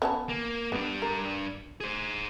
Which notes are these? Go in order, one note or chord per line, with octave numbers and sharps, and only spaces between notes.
B3 C#4 A5
A#3
G2 B3 D4
A#4
G#4 C5